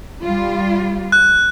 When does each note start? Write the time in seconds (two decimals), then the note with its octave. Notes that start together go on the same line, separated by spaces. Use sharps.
0.23 G3 F4
1.12 F#6